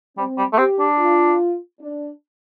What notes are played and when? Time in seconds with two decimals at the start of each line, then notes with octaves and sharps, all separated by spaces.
0.17 G3 C4
0.38 G3
0.53 A3
0.58 C4 G4
0.79 D4
0.99 F4
1.80 D4